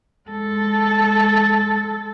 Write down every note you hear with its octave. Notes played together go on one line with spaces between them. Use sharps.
G#3 A4